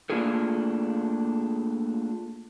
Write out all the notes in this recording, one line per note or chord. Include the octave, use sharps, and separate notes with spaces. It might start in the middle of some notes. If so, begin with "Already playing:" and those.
A3 A#3 D4 F4 G#4 A4